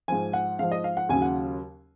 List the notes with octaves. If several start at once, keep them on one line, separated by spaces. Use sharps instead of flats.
G#2 F3 G#5
F#5
G#2 F3 F5
D#5
F5
F#5
D#2 C#3 F#3 G#5
F#5